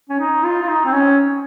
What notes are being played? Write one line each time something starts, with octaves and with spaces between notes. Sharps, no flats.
C#4
D#4
F4
F4
D#4
C4
C#4